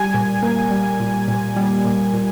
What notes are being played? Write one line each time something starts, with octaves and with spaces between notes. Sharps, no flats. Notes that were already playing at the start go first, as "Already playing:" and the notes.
Already playing: G3 G#5
A#2
A#3
G3
A#2
A#2
G3
A#2
A#2